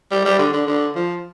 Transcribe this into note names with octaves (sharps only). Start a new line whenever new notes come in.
G3
G3
D3
D3
D3
F3